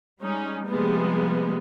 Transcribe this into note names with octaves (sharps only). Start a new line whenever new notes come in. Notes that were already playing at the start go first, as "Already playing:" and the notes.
G3 G#3 C#4 D#4
C3 F3 G3 G#3 A#3 B3